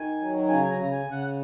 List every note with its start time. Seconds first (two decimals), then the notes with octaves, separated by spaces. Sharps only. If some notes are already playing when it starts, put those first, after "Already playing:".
Already playing: D#3 G#5
0.20 F#3
0.48 C#3 G#5
0.62 G#5
0.70 A#5
0.77 C#3
0.91 G#5
1.06 C#3
1.11 F#5